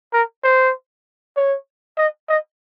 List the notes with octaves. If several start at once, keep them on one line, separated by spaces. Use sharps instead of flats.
A#4
C5
C#5
D#5
D#5